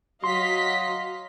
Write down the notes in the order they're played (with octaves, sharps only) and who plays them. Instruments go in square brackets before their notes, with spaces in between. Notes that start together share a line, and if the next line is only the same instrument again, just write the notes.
[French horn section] F#3 [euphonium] F#4 [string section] D#5 F5 B6 [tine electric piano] C6